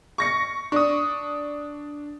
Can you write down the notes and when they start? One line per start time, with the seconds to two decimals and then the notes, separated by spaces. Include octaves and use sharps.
0.18 C#6 A#6 C#7
0.72 D4 C#6 D#6